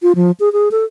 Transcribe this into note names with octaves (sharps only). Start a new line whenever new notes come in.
F4
F3
G#4
G#4
A4